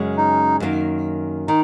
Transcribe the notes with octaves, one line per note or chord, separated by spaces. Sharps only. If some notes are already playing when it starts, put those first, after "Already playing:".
Already playing: F#2 C#3 G#3
D#4
F#2 D#3 A#3
D#3 D#4